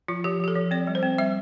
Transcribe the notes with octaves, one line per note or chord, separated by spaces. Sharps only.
F3 F4
F3 G4
F3 G4
A4
F3
C4 D5
G3
C5
C4
G3 E5